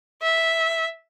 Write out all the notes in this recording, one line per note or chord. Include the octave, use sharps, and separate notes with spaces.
E5